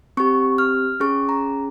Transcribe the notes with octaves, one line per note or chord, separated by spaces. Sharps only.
C4 G4 C#6
F6
C#4 G#4 C#6
A#5